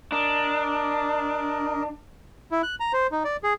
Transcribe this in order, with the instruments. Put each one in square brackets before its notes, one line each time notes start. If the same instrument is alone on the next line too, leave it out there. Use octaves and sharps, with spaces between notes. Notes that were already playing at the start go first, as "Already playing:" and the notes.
[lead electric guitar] D4 [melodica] A#4 D#5
[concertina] E4
F#6
A#5
C5
D#4
D5
G#4